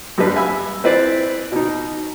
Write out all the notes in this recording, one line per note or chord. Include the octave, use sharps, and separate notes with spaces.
F#2 G3 D4 B4
E5 F5 G#5 B5 E6
C4 E4 B4 C5 D5
B2 D#4